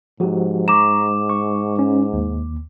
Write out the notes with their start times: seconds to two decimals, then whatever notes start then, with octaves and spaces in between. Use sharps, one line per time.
0.20 G#2 F3 F#4 G4
0.68 A#5 C#6 D6 E7
1.30 C#6
1.79 C#4
2.13 D#2